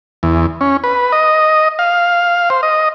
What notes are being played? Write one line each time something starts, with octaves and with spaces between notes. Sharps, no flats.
E2
C#4
B4
D#5
F5
C5
D#5